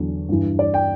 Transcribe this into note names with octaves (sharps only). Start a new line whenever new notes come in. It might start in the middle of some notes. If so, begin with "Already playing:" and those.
Already playing: E2 D3 F#3
G2 E3
D5
G5